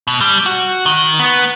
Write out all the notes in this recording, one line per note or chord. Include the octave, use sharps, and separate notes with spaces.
B2
G3
F#4
D#3
B3